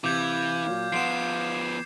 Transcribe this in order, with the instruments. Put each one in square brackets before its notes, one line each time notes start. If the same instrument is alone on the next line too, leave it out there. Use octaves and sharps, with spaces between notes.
[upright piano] C3 [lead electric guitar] E3 [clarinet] F5 [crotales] D6 G6 G#6
[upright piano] A#2 F#3
[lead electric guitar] F3 B3 [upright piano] F#5 C6 D7 [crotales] C7 E7